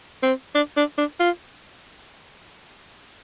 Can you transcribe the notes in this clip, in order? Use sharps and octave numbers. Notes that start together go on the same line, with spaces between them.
C4
D4
D4
D4
F4